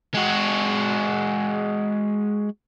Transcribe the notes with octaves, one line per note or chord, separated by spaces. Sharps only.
G#3 F#4